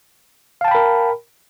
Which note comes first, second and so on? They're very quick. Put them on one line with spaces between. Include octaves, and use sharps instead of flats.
F5 A5 G5 B5 A#4